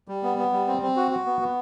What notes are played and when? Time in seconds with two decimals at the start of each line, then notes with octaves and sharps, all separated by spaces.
0.08 G3
0.23 B3
0.38 B3
0.52 G3
0.68 C4
0.82 C4
0.97 F#4
1.11 F#4
1.26 B3
1.41 B3